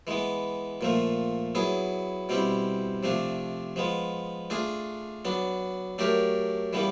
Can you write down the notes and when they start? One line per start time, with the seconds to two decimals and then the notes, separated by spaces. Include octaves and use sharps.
0.07 E3 G#3 B3
0.81 A#2 F3 A3
1.55 F#3 B3 E4 G#4
2.29 B2 G3 C4 E4
3.03 C3 F3 A3 D4
3.76 F3 G#3 B3
4.50 A3 D4 F4 G#4
5.25 F#3 B3 D4
5.98 F#3 A3 D4 G4 A#4
6.73 C#3 E3 G3 B3